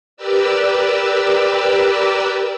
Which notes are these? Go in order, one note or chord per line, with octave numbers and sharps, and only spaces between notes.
G4 A#4 B4 D5 E6